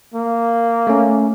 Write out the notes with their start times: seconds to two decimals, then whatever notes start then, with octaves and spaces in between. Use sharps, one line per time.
0.14 A#3
0.87 A3 C#4